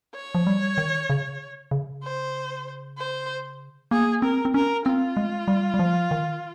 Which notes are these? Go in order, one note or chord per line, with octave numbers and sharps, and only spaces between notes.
C#5
F3
G3
D#3
C#3
C#3
C5
C5
A#3 G#4
C4 A#4
C4
C#4 A#4
C4 F4
G#3
G3
G3
F3
D#3